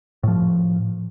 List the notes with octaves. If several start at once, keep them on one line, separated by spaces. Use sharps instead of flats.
A2 F3